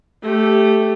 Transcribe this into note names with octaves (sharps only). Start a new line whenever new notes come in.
A3 G4